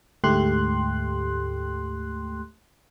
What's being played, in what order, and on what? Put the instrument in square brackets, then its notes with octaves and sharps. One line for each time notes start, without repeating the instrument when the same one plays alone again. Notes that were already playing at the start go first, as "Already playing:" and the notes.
[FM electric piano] D2 G#2 A3 G4 C6 F#6